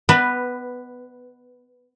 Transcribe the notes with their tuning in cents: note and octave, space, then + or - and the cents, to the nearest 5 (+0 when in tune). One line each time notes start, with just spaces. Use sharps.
B3 +10 B4 +0 D5 +45